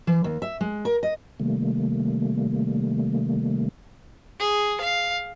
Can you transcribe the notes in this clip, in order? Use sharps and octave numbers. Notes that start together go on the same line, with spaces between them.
E3
D#2
E5
G#3
A#4
D#5
C3 D#3 G3 A3 A#3
G#4
F5